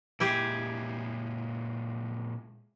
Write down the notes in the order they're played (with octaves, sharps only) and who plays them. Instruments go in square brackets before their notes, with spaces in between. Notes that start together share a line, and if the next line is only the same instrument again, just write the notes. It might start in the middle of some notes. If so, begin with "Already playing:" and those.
[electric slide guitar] A#2 G#3 [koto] E4 G4 G#4